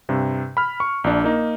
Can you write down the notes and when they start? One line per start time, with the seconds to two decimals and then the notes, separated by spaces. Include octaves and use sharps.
0.09 G2 C3
0.57 B5 F6
0.80 C#6
1.04 A#1 D4
1.24 A#3 D#4